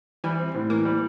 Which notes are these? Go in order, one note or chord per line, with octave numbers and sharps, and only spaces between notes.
E3 G3
C4
A2
E3 A#3
G3